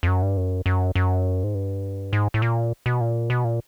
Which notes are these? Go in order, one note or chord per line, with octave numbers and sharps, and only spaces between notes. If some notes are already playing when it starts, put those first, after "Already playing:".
F2
F#2
G2
F#2
F#2
F#2
G#2
G2
G#2
A2
A#2
B2
A#2
B2
A#2